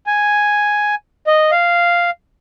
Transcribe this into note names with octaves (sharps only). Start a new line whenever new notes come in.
G#5
D#5
F5